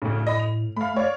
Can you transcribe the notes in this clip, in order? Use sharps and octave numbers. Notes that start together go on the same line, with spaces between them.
D2 A2 C#3
D#5 B5
F7
A3 F5 B5
C#5 D5 F5